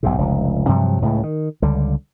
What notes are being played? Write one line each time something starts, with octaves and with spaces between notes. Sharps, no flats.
B1 G#2 C3
F1 C#2
G2 C3 F3 F#3
C#2 A2 C#3
D#3
C#2 D3 G3